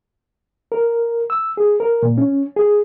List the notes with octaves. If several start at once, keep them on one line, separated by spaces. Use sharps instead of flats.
A#4
E6
G#4
A#4
A#2
C#4
G#4